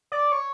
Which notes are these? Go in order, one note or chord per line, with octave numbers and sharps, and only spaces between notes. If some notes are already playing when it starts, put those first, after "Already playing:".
D5
C#5